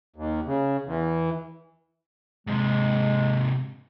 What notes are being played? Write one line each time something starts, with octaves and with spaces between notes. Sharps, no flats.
D#2
C#3
E2
G#2 C3 G#3